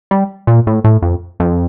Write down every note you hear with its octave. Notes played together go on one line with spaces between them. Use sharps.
G3
A#2
A2
A2
F2
F2